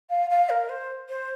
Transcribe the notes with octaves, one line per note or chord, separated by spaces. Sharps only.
F5
F5
A#4
C5
C5